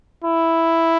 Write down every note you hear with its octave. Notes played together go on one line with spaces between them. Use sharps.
E4